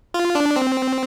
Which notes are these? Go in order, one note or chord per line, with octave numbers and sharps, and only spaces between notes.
F4
D4
C4